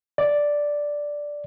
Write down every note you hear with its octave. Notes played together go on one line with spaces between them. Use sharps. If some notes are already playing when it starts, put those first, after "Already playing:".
D5